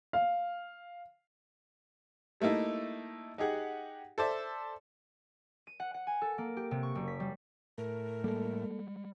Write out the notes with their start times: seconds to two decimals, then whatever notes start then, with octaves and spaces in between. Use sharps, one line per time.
0.13 F5
2.40 G3 A3 A#3 D#4 E4
3.38 D#4 G4 G#4 F#5
4.18 A4 C5 D5 E5
5.67 D#7
5.80 F#5
5.94 F#5
6.07 G#5
6.21 A4
6.38 A#3
6.57 G4
6.71 C3
6.83 C#6
6.95 F#1
7.08 B6
7.20 G3
7.78 A2 A3 A#4
8.24 G3 G#3 A#3 A4